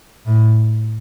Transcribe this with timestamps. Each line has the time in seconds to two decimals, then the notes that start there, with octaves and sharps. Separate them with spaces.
0.26 A2